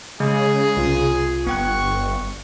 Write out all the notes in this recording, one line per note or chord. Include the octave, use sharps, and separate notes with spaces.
C#3 G#3 G#4
C2 F4
G1 B3 G5 C#6 F#6